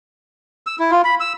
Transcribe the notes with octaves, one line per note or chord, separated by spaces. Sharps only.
E6
E4
F4
B5
E6